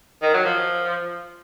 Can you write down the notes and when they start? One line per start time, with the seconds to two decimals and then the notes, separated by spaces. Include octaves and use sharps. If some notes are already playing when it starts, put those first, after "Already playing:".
0.22 D#3
0.34 F#3
0.45 F3